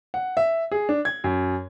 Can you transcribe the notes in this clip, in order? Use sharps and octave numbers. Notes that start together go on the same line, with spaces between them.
F#5
E5
G#4
D4
G#6
F#2